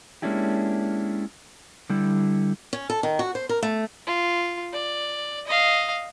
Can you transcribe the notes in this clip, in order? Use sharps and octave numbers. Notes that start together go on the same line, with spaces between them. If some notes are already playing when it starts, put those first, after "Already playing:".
G#3 A#3 C#4 D4 E4 G4
D3 G3 E4
C#4
A4
D#3
F#4
C5
A#4
A3
F4
D5
D#5 F5